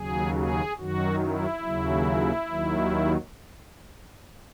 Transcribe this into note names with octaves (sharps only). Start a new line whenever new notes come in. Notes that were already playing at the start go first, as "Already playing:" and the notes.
Already playing: D#2 C#3 F#3 G#4
G#4
F#2 D#3 F#3 F#4
E4
D#2 C#3 F#3
D#2 D#3 F#3